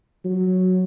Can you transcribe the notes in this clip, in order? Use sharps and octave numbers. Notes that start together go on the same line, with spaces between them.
F#3